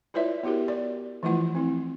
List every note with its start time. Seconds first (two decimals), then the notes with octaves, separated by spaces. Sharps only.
0.14 E4 F4 B4 C#5 D5 E5
0.43 B3 E4 F#4 G4 A#4
0.68 D5
1.23 E3 F3 A3 E4 F4 F#5
1.55 C4 E4